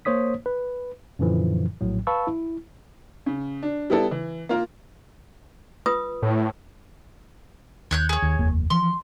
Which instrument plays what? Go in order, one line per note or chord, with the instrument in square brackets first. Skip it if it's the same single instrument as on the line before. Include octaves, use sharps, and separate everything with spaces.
[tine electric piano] A#3 C5 C#5 D#6 B6
B4
F#2 A#2 D3 E3 F3
A#1 A2 F#3
B4 F5 A5 B5 C#6 E6
E4
[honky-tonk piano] C#3
D4
G3 B3 E4 A4
E3
A#3 F4 A#4
[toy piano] F4 B4 D#6
[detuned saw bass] A2
[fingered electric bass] D#2 [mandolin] C#5 F#6 G6
[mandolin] G#4 C#5
[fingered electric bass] D#2
F1 D#2 A#3
[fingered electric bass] E3 F3 [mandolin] C6